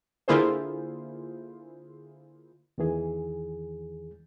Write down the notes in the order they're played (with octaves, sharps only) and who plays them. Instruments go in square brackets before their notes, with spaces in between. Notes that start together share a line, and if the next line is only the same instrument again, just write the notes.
[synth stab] D3 A#3 E4 F4 G#4 C5
[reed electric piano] E2 D#3 E3 G#4